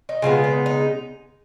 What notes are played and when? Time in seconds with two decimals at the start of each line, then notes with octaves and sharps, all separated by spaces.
0.09 D#4
0.22 C#3 F3 G#3 B3 F4
0.44 D#4
0.66 D#4